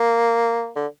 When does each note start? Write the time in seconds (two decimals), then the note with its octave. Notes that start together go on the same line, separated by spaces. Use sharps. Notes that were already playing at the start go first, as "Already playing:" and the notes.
Already playing: A#3
0.76 D3